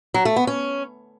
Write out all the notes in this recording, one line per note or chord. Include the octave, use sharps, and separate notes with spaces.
F#3
A3
B3
C#4